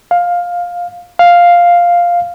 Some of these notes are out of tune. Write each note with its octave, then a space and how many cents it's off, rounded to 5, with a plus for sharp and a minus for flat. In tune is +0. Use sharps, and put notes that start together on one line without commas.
F5 +10
F5 +0